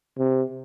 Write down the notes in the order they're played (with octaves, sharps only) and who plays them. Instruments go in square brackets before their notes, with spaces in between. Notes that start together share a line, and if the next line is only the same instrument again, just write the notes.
[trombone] C3